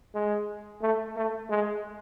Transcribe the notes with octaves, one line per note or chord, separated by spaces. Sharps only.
G#3
A3
A3
G#3